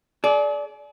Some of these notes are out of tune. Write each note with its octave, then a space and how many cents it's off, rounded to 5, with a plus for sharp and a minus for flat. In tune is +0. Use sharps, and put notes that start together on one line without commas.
G#4 +45 D5 -10